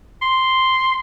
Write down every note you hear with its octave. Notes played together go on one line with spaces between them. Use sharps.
C6